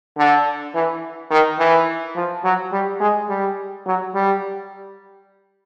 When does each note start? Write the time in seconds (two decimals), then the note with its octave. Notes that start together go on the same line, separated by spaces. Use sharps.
0.18 D3
0.74 E3
1.31 D#3
1.59 E3
2.16 F3
2.44 F#3
2.72 G3
3.00 G#3
3.29 G3
3.86 F#3
4.15 G3